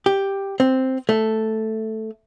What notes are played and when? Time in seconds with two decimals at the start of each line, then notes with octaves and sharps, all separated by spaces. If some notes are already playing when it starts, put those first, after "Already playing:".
0.06 G4
0.60 C4
1.09 A3